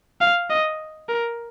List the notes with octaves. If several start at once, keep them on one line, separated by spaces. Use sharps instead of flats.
F5
D#5
A#4